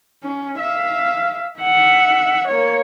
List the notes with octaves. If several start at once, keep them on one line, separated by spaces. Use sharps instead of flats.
C#4
E5 F5
E5 F#5
A#3 C#5